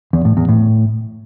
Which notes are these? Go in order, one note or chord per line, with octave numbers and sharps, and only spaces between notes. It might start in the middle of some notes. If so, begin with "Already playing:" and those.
E2
A2
E2
A2